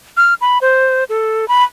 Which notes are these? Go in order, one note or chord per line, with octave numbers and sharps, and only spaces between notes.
F6
B5
C5
A4
B5